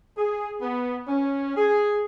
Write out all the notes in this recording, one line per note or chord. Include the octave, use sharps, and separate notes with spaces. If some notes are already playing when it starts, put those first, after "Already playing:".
G#4
B3
C#4
G#4